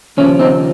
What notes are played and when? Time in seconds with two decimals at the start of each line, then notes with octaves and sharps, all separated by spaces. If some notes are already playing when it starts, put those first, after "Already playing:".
0.17 D#2 C#3 F3 C#4
0.39 C4 D#4